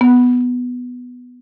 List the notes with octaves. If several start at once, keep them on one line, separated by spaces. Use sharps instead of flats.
B3